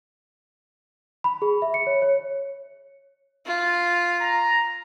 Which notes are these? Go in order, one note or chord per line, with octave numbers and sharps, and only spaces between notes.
B5
G#4
E5
C#7
C#5
C#5
F4
A#5